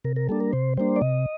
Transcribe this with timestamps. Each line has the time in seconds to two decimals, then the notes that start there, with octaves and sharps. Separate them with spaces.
0.04 C3 A#4
0.16 A#4
0.29 G3 A#3 D4 A4
0.40 A#4
0.53 C3 C5
0.77 G3 A#3 D4 C5
0.96 D5
1.01 C3 D#5